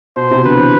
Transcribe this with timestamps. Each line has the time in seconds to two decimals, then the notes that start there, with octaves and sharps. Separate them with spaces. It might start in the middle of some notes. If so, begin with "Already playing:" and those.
0.16 B2 C5
0.31 C3
0.45 D3 B4
0.55 E3